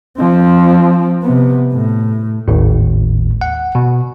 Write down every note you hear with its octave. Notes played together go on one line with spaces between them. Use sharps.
F3 C4
C3 B3
A2
G#1 D#2 A2
F#5
B2